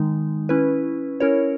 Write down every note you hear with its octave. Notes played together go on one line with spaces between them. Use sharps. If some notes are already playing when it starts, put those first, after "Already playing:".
Already playing: D#3 G#3 D#4
C#4 E4 B4
C#4 E4 A#4 C#5